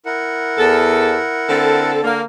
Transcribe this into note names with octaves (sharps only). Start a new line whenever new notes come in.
E4 A#4 F#5
E2 A4
D3 C4 A4
D3 A#3